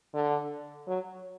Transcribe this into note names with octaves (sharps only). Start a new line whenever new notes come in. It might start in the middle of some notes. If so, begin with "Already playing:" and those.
D3
F#3